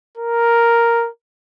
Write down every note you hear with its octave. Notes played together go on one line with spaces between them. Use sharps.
A#4